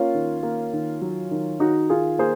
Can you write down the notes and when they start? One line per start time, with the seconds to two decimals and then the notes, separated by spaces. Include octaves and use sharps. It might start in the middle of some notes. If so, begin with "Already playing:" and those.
Already playing: A#3 C#4 F4
0.14 D#3
0.43 A#3
0.73 D#3
1.01 F#3
1.31 D#3
1.60 D#3 D#4 F#4
1.90 D#3 F4 G#4
2.19 A#3 G#4 C5